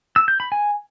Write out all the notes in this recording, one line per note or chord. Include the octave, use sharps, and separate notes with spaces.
E6
G6
B5
G#5